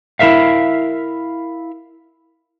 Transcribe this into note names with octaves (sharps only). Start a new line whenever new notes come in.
E4 G4 A#4 E5 F5